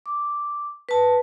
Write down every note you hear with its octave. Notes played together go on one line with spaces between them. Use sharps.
D6
B4 A5